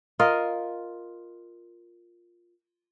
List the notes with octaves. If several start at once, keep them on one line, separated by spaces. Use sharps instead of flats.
F4 A#4 D#5